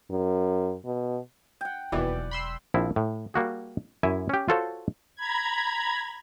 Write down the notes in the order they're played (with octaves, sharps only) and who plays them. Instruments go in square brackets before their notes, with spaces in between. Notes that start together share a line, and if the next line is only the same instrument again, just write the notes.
[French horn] F#2
B2
[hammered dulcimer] F#5 G5
[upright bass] E1 F#3 [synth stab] D#2 B2 E3 [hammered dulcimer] D5
[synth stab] B5 C6 E6
[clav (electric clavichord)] A#1 F3 C4 E4
A2
G3 A#3 F#4 G#4
F#2 E4 E5 G#5
C#4 G4
F4 F#4 A4 C5 C#5 F5
[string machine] A#5 B5 G#6